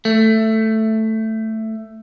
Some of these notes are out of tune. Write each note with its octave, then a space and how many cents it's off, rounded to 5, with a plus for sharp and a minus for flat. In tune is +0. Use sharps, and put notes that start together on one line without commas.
A3 +5